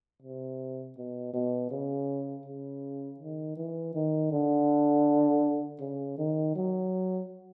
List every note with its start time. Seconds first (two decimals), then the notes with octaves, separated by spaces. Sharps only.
0.22 C3
0.97 B2
1.34 B2
1.71 C#3
2.46 C#3
3.20 D#3
3.57 E3
3.95 D#3
4.31 D3
5.80 C#3
6.18 D#3
6.56 F#3